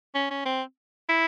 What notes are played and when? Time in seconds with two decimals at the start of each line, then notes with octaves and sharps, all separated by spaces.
0.15 C#4
0.31 C#4
0.46 C4
1.09 E4